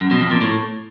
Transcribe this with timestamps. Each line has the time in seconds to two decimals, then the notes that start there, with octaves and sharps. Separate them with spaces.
0.01 F#2
0.11 B2
0.21 F2
0.31 A#2
0.41 A2